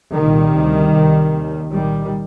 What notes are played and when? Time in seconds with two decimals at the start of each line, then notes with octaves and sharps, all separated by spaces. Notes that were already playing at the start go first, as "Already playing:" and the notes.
0.14 C2 A#2 D#3 G3
0.54 D2 C3
0.93 C2 C3
1.32 D#2
1.71 C2 A#2 D#3 G3